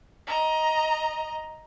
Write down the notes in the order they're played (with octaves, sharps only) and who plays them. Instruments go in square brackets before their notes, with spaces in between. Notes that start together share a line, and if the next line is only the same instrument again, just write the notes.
[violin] D#5 A#5